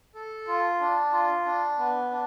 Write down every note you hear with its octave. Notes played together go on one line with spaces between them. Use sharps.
A4
F4
D4
F4
D4
B3
D4